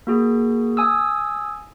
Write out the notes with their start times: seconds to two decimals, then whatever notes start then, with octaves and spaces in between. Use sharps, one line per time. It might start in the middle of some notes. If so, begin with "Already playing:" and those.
0.07 A#3 F#4 G#4
0.77 G#5 D#6 E6